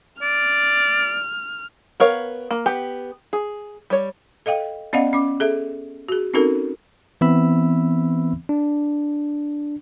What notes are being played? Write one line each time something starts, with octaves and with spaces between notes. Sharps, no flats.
D5 F6
B3 A#4 C#5 F5
A#3
B3 G4
G#4
G3 C#5
A4 D#5 F5 G5
B3 C#4 D5 D#5 F5 F#5
C#4 D6
G#4 A4 E5
F#4 G#4
C4 C#4 D#4 F#4 A4 A#4
E3 B3 C4 E5 B5 E6
D4